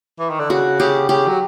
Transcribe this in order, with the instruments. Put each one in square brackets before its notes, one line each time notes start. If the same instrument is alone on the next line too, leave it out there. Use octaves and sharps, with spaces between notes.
[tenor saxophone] E3
D#3
D3
[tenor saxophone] C#3 [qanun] F#4
[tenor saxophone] C#3 [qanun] G4
[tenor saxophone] C#3 [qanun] G4
[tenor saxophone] F#3